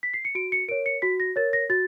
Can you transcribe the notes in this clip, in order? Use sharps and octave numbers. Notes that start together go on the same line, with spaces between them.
B6
C7
C#7
F#4 D7
C#7
A#4 C#5 D7
C#7
F#4 B6
A#6
A#4 C#5 A6
A#6
F#4 A6